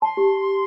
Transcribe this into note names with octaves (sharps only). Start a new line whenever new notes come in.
A5 C6
G4